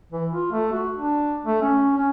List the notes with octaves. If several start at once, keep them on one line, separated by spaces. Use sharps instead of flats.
E3
F4
A3
F#4
D4
A3
C#4
C#4